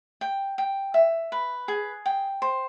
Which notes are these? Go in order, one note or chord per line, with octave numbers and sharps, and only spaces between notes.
G5
G5
E5
B4
G#4
G5
C5